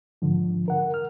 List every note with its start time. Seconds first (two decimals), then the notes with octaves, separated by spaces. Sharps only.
0.22 G#2 D3 F3
0.68 A#4 F#5
0.94 F6